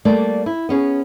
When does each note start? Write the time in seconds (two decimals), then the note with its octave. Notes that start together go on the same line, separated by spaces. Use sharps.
0.05 G3 A3 A#3 D5
0.46 E4
0.69 B3 C#4 G#4